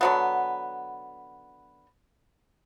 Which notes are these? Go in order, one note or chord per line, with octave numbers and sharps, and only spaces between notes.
D3 F#3 B3